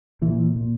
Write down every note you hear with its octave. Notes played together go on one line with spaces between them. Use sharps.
A#2 E3
A#2